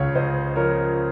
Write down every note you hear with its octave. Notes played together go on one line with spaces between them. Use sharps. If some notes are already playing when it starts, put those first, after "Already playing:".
Already playing: C#2 C#3 C#5 F5
C#2 C5 D#5
F3 A#4 C#5